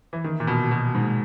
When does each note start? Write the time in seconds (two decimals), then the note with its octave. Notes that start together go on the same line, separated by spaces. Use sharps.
0.13 E3
0.24 D#3
0.40 A#2
0.47 B2
0.71 B2
0.95 G#2